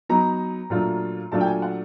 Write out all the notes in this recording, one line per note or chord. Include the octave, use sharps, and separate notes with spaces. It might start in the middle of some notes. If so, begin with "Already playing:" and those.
F#3 B3 D#4 A#5
A#2 F#3 A3 D4 F4
A#2 F#3 A3 D4 F4 A5
G5
G#5
F#5